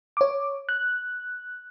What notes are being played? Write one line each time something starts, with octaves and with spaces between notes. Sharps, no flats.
C#5 D6
F#6